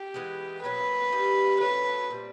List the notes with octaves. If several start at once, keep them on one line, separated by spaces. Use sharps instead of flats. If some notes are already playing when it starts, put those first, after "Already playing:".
Already playing: G4
E3 G#3 B3
B2 F#3 A#3 B4
G3 A#3 D#4 G4
C#3 F#3 A3 B4
A#2 G3 C4